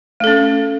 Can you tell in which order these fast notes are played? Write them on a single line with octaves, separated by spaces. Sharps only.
A3 A4 C#4